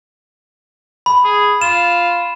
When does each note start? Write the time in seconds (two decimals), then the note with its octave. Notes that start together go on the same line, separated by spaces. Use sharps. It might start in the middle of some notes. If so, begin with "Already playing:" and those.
1.06 B5
1.24 G#4
1.62 F4 E7